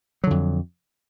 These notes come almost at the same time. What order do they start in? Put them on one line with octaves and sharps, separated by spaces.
F#3 D3 F2